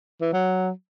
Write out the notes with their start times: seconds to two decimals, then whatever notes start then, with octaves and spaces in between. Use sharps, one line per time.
0.21 E3
0.33 F#3